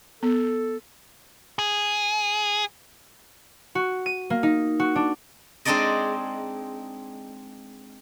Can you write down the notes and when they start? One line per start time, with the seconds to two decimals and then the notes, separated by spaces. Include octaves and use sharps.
0.23 B3 A4
1.59 G#4
3.75 F#4
4.06 D#7
4.30 A#3
4.43 D#4
4.79 F#4
4.96 D4
5.65 G#3 C4 D4 D#4 D5 D#5